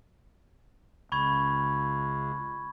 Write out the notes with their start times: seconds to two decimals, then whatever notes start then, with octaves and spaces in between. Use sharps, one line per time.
1.12 C#2 B5 C#6 G#6